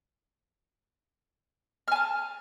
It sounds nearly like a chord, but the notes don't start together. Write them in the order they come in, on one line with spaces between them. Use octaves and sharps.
F6 G#5 A5